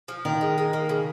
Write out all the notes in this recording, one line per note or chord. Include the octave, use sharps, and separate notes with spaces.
F3
D#3 A#4
G#3
G#3
A#3
C#3